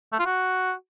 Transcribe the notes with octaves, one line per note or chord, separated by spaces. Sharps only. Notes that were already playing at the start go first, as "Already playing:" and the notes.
A3
F4
F#4